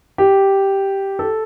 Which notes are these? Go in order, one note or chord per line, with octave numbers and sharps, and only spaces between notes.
G4
A4